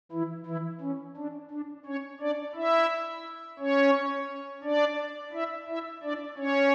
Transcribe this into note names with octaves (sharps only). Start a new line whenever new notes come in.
E3 E4
E3 E4
C#4
D4
D4
C#4 C#5
D4 D5
E4 E5
C#4 C#5
D4 D5
E4 E5
E4 E5
D4 D5
C#4 C#5